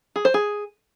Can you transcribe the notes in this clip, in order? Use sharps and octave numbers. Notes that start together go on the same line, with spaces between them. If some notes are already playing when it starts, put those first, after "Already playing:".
G#4
C5
G#4